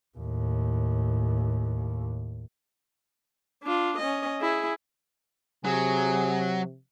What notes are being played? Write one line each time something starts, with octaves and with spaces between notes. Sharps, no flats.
D#2 A2
D4 F4
C#4 D#5
E4 G#4
C3 F#3 G#4